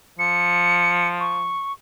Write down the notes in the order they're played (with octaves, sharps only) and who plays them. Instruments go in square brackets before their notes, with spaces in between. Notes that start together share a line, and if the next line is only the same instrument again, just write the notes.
[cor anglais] F3 [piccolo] C#7
[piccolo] C#6